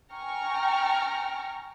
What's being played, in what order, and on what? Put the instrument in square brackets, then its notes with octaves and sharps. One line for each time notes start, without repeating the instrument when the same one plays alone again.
[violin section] G5 G#5 A#5 C#6 F6